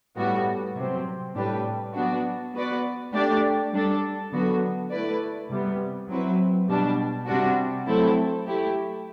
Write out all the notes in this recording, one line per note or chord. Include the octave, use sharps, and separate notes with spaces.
A2 G3 B3 F#4
C3 F#3 C4
A2 G3 D4 G4 B4
F#3 B3 D4 F#4
B3 F#4 B4 D5
A3 D4 G4 D5
G3 D4 A4
D3 F#3 B3 F#4
A3 E4 B4 D5
C3 G3 B3
F#3 C4 E4 B4
B2 G3 D4
C3 G3 D4 F#4
F#3 A3 C4 E4 A4
A3 E4 G4